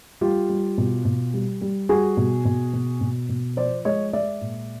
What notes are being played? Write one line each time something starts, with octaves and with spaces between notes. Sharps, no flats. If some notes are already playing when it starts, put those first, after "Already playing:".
G3 F4 G4
G3
B2
B2
G3
G3
G3 F#4 G#4
B2
B2
B2
B2
B2
F3 C5 D5
G#3 C#5 D#5
G#3 D5 E5
A#2